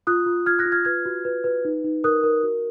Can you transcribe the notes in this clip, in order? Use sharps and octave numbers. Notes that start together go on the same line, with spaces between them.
F4 D#6 F#6
F4
F4 F6 G#6
F#6 A#6
F4
F6 G#6
B4 F6 G#6
F#4
B4
B4
D#4
D#4
A#4 D#6 F#6
A#4
F#4